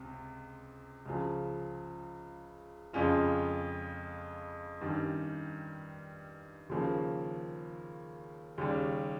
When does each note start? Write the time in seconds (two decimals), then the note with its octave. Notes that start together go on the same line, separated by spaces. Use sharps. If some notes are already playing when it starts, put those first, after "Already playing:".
Already playing: C#2 C3 C4
1.06 C#2 C#3 F3
2.93 F2 C#3 G#3 C#4 F4
4.81 G2 D#3 G3 C#4
6.69 D#2 C#3 F3 A#3
8.58 D#2 C#3 G3